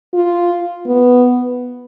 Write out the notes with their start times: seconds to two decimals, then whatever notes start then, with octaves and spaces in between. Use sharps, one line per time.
0.14 F4
0.86 B3